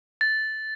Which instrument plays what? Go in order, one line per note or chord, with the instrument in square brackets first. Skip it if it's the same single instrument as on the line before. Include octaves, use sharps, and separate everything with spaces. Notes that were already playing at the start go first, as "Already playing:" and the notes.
[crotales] A6